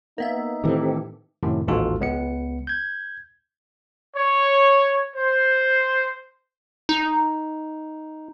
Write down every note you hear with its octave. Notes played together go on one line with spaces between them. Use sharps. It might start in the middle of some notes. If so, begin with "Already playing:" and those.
A#3 B3 D#4 E5
A2 D#3 E3 C4 G4 A4
F#2 A2 C3 D#3
A1 D#2 G#2 F4 F#4 A4
C#2 B3 C#7
G6 G#6
C#5
C5
D#4